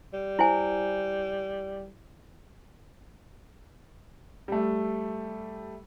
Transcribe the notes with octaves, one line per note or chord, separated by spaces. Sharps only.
G3
E4 C5 G#5
G3 A3